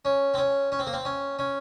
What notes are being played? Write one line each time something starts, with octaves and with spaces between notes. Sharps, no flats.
C#4
C4
C#4
C#4
C4
A#3
C4
C#4
C#4